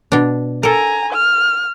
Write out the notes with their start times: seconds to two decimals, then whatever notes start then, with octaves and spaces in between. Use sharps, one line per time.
0.12 B2 D4
0.63 A4 A#4 G#5 A#5
1.13 F6